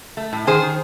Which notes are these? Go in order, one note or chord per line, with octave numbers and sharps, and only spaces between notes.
A3
A2
D#3 G#4 C5
D#3